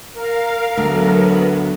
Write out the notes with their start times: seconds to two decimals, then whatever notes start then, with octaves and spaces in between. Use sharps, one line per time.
0.14 A#4 F5
0.78 D2 F#3 B3